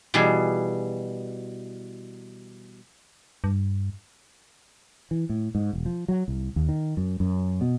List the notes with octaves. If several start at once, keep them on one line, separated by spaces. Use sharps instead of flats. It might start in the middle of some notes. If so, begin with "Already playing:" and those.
B2 E3 G3 G#4
G2
E3
A2
G#2
E1
F3
F#3
C2
D#2
D#3
F#2
F#2
B2